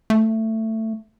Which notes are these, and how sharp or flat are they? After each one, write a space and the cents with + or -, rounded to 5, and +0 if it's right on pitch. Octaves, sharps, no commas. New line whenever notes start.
A3 +15